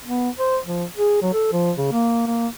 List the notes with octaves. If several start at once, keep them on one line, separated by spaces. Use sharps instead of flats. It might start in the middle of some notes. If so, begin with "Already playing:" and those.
B3
C5
F3
G#4
F#3
A4
F3
C#3
A#3
A#3